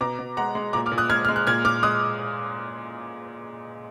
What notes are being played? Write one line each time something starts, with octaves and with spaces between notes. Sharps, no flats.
B2 A#5 D6
B2
G#3 F#5 A#5
G#3
A#2 A#5 D6
D6 F6
A#2
D#6 F#6
G#3 F6 G#6
G#3 F6
F#6
A#2 F6 G#6
A#2 D6 F6
G#3 D#6 F#6